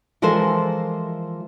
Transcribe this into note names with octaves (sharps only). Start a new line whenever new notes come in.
E3 F3 G#3 A4 A#4 C5